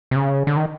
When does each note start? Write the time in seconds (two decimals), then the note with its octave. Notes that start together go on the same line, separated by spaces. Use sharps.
0.11 C3
0.16 C#3
0.47 D3
0.56 D#3